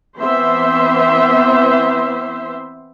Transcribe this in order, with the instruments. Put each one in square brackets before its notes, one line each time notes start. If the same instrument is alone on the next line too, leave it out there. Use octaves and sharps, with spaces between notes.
[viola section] E3 B3 C4 C5 E5 C6